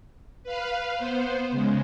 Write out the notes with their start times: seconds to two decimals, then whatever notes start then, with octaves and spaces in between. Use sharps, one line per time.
0.44 B4 F5
0.97 B3 C5
1.51 C#3 G#3